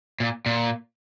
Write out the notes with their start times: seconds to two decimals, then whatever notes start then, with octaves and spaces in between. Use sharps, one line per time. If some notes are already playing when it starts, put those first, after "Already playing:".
0.20 A#2
0.46 A#2